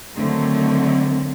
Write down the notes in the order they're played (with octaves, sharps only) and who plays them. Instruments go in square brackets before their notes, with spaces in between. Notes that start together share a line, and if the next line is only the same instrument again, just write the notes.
[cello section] D3 D#3 F#3 A3 C4